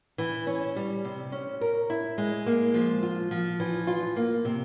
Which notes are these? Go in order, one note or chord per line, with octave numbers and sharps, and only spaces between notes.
E3
C#4
G3
C3
C#4
A#4
E4
G#3
A#3
F3
F4
F3
E3
F4
A#3
C3